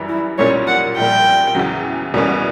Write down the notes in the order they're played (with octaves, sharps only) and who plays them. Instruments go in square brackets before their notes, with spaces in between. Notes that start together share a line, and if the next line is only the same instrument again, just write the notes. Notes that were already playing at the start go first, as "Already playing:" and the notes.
Already playing: [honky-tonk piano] F#2 E3 G3
[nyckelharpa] E4
[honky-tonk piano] B1 A#2 G3 A#3 C#4 [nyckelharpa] C#5
[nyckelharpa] F#5
[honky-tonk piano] A#1 A#2 G3 A#3 [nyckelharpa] G5
[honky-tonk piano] E2 C#3 F#3
E2 B2 G3 A#3 C#4